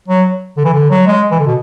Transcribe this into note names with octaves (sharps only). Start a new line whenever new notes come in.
F#3
D3
E3
D3
F#3
G#3
E3
D3
B2